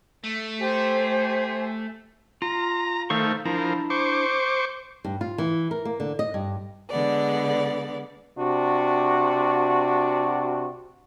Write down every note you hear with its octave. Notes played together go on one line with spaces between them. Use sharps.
A3
G4 C5 G#5
F4 A#5
D#3 A3 C5 F5 C#6
F3 D4 E4 A#4
C5 C#6 D6
G2
F4
E3
A#4
A#3
D3
D#5
G2
D3 G#3 B3 D5
C3 D4 F#4